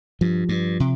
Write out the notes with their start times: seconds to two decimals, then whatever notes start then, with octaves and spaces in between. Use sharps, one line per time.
0.21 G2 F3
0.49 G2
0.80 C3